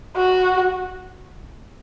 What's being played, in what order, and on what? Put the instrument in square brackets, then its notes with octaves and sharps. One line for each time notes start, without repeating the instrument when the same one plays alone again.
[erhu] F#4